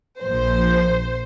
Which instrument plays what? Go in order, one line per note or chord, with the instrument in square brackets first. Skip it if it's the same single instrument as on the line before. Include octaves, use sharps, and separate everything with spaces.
[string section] A#1 A#2 F3 C5